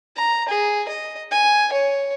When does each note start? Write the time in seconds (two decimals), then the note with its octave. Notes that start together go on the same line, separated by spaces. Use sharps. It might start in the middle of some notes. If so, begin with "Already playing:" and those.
0.16 A#5
0.48 G#4
0.88 D#5
1.31 G#5
1.73 C#5